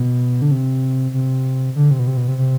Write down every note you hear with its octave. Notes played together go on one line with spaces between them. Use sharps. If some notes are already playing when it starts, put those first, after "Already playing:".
Already playing: B2
D3
C3
C3
D3
C3
B2
C3
B2
C3
C3